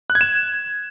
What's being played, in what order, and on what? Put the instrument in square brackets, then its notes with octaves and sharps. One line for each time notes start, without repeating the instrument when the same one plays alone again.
[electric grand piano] F#6
G#6
E7